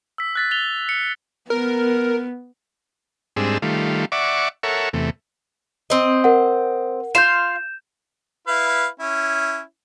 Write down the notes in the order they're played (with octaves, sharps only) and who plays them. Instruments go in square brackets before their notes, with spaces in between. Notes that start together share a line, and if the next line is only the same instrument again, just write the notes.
[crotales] E6 B6
F#6 A6 B6
A6 F7 G7
C#7
[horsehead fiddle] B3 [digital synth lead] A#4
[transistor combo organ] G#2 G3 C4 D4 G#4 E6
D#3 G3 A3 F4
D5 E5 F#5 C#6 D6
A4 A#4 C#5 E5 F#5
E2 C3 A3
[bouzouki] C4 D#5
[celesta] A#4 F#5
[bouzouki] F4 F5 [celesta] G6 E7
[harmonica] E4 B4 F5
C#4 E4